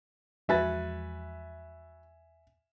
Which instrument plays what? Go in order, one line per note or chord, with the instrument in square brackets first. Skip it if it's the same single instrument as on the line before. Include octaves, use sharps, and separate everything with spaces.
[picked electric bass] E2 F3 G#3 [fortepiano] F#4 B4 [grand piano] E5 G#5 A6